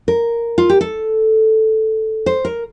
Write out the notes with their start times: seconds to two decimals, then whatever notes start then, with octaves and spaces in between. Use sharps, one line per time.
0.08 A#4
0.58 F4
0.69 G4
0.81 A4
2.26 C5
2.45 A#4